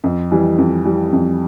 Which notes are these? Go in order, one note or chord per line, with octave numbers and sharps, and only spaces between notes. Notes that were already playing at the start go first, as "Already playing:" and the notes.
F2
E3 G3
F2
E3 G3
F2